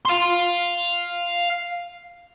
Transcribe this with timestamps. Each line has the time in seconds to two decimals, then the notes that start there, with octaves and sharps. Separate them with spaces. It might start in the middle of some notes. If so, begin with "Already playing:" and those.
0.05 F5 C6